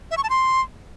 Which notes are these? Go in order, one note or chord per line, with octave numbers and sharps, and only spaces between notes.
E5
C#6
A5
C6